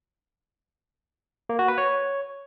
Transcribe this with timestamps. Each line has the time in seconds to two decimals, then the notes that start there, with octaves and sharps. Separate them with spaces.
1.49 A#3
1.59 F#4
1.68 B4
1.78 C#5